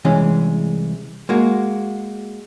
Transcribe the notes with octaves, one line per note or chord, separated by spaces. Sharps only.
C2 E3 G#3 C#4
G#3 A#3 F#4